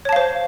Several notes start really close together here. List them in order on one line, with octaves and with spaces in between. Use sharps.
C#5 A5 F5 C5